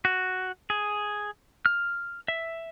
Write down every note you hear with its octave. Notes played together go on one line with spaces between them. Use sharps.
F#4
G#4
F6
E5